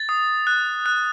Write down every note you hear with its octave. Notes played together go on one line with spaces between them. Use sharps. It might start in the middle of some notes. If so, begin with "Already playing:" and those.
Already playing: A6
D#6
F#6
F#6